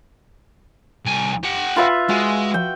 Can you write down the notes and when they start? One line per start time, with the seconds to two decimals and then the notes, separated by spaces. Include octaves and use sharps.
1.05 C2 G#5
1.43 G4 F#5
1.76 F4 B4 E5
2.09 G#3 F#4
2.54 G5